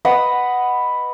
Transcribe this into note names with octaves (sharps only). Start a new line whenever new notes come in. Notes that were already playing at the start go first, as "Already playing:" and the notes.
B4 D#5 F#5